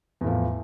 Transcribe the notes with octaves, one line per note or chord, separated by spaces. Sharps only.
E2 A2 F3